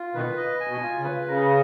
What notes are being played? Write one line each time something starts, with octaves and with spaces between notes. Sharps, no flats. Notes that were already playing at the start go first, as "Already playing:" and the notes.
Already playing: F4
B2 D#3 B4
D#5
G#5
B2
F4
C#3
B4
C#3 A#4